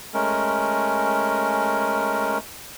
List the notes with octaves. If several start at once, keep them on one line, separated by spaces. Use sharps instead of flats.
G#3 A3 C#4 A#4